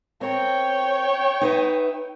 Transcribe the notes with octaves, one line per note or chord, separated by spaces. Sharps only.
C4 A#4 C#5 G5
D#4 B4 E5